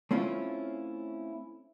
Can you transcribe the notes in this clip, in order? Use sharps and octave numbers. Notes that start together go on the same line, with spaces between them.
A3 C4 C#4 E4 F4